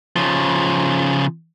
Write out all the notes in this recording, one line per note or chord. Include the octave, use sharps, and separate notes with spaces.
C#3 F3